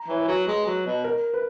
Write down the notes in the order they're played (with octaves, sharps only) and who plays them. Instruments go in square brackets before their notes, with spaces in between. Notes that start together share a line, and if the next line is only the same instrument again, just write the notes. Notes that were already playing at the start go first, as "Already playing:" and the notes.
Already playing: [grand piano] A#5
[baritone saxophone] E3 [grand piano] C#5
[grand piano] B4
[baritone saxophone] F#3
G#3
F#3
B2
[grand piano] A#4
B4